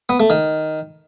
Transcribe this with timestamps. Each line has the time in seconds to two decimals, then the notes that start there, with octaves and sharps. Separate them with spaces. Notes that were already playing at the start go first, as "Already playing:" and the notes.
0.09 B3
0.20 A3
0.30 D#3